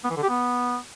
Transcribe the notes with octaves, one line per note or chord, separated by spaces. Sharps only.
B3
E3
D3
G4
B3